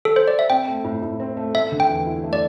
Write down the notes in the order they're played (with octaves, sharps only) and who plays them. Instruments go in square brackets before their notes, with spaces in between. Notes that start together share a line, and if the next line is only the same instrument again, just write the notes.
[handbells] A4
C5
D5
E5
[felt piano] C4 [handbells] G5
[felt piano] A3
A2
A2
C4
A3
[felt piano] A3 [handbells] E5
[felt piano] D3
[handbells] G5
[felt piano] E2
E4
A3
[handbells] D5